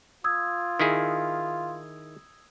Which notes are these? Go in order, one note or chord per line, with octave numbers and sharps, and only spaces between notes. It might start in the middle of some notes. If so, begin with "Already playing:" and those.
F4 D#6 E6 G#6
D#3 E4 G#4